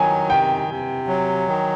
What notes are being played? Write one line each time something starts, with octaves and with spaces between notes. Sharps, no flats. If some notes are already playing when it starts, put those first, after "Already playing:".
Already playing: D#3 F#3 G#5
C3 G5
C3
F#3
D#3